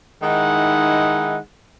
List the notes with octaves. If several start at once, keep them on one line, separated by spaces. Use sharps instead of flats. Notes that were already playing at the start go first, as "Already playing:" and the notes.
D#3 G#3 D#4 E4 F#5